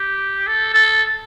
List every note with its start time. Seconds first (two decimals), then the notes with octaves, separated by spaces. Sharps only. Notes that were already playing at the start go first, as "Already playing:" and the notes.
Already playing: G4
0.47 A4
0.74 A4